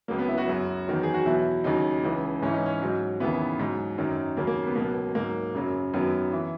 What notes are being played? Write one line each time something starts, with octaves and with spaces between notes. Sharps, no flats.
C#2 C#3 F#3 A#3
B3
E4
F#4
F#2 C#3 F#3
E2 D#3 F#3
G#4
F#4
E2 B2 F#3 E4
D#2 C#3 F#3 D#4
C#2 C#3 E3
G#2 E3 C#4
D#4
C#4
G#2 F#3
D#2 C#3 E3 B3
G#2 F#3
F#2 D#3 F#3
D#2 C#3 F#3 A#3
A#3
B3
C#2 B2 F#3 A#3
G#2 F#3 A#3
F#2 C#3 F#3
F#2 D#3 F#3 B3
E3